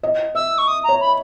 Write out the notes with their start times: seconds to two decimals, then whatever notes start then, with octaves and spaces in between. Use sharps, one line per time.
0.03 D#5
0.35 E5 E6
0.58 C#6
0.68 D#6
0.84 A#5
0.89 C#5
1.01 B5